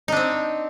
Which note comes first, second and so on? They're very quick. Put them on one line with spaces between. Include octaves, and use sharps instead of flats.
D#4 D4 C4